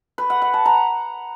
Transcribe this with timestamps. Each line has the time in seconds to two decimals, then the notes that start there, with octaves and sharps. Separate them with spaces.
0.18 B4
0.30 F#5
0.42 F#5
0.54 A5
0.65 A#5